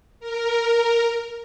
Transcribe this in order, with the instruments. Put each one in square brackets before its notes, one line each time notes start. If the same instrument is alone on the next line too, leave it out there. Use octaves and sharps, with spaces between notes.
[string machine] A#4